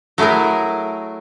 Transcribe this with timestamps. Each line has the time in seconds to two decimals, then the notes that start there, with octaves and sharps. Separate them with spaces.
0.18 F#3 A3 E4 G#4 A#4